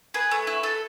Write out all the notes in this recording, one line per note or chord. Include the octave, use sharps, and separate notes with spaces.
G#4 B4
A3
E4
A4